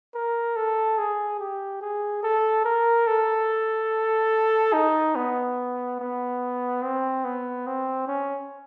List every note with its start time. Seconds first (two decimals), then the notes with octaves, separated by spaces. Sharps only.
0.15 A#4
0.56 A4
0.98 G#4
1.40 G4
1.81 G#4
2.23 A4
2.65 A#4
3.07 A4
4.73 D#4
5.16 B3
5.99 B3
6.82 C4
7.25 B3
7.67 C4
8.08 C#4